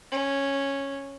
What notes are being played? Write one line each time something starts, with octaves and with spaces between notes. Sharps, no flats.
C#4